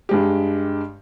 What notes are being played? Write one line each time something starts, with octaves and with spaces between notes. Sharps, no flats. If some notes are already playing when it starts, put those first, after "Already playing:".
G2 G#3 G4